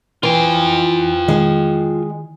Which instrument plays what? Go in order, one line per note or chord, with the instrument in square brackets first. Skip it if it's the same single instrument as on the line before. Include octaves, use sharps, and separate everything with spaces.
[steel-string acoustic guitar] E3 [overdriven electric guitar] F4 G5
[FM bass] D#3 [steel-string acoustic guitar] G#3